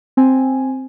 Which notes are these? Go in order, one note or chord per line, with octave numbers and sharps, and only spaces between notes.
C4 G#5